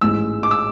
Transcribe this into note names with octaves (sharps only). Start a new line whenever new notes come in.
A1 G#2 G#3 E6
D6
E6